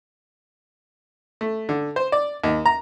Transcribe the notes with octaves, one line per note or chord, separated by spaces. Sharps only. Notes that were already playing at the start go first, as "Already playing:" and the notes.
A3
D3
C5
D5
D#2
A#5